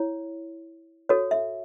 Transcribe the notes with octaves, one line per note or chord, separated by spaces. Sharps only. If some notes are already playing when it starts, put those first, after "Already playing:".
Already playing: E4 C#5
F#4 A4 C#5
E5